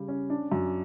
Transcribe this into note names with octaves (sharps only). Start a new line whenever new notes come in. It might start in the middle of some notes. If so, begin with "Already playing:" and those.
Already playing: C#3 G3
C#4
D4
F#2